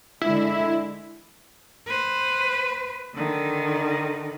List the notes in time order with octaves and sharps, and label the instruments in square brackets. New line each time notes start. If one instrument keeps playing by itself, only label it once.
[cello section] D3 G#3 [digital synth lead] E4
[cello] B4 C5
D3 D#3